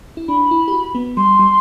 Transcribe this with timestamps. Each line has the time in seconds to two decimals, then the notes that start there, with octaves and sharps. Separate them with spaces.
0.17 E4
0.28 D4 B5
0.51 E4
0.68 G4
0.73 F#4
0.95 B3
1.17 G3 C6
1.39 G3